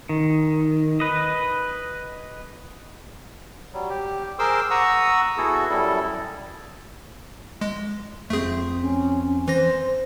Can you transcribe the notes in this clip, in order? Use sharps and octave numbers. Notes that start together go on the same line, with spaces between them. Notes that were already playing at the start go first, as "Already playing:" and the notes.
D#3
B4 D#5
F#3 G3
G4
G#4 A#4 C5 C6 D6 E6
F#5 A#5 C#6 D#6 E6
B3 E4 F#4 G#4 A4
F#2 G3 E4 A4
G#3
F2 A3 C4 G#4
C#4
E3 C5 A#6